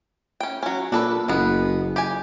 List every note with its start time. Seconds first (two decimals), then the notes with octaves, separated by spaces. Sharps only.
0.40 C#4 G5
0.63 F#3 C#4
0.92 A#2 D4 A4 B4
1.28 F#1 G#3 B3
1.96 G4 G#5